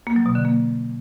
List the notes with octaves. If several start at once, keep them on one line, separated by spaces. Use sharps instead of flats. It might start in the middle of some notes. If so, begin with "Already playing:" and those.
A#3
F#3
B2
D3
A#3